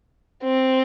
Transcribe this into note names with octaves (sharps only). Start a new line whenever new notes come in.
C4